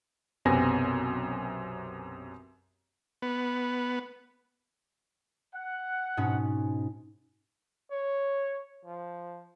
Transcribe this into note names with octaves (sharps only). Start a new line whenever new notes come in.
B1 F#2 C3 B3 G#5 A#6
B3
F#5
G#2 B2 C#4
C#5
F3